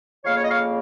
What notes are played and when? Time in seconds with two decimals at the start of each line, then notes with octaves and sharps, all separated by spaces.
0.24 F2 C#3 A#3 C#5 F5
0.35 C#5
0.42 D#5
0.49 C#5 F5